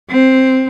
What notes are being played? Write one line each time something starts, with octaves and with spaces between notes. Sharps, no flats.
C4